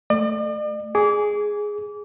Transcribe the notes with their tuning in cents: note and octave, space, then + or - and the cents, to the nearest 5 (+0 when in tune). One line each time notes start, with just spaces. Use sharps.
A3 +0 D5 +45
G#4 +0 D6 -30